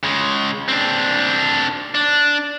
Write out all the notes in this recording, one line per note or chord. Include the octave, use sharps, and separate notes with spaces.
C#3 G#3
C4 D4
D4